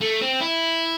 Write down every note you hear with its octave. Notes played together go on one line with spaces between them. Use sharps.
A3
C4
E4